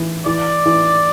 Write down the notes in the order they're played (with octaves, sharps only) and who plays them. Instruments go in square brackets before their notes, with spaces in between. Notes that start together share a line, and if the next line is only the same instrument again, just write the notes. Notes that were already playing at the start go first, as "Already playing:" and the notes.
Already playing: [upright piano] E3
[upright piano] E3 [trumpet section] D5
[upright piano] E3